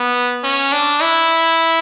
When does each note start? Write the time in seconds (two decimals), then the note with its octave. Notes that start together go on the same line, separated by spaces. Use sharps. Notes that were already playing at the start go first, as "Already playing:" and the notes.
Already playing: B3
0.44 C#4
0.72 D4
1.01 E4